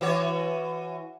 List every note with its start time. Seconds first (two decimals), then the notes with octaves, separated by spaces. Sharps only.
0.01 E3 F#4 C#5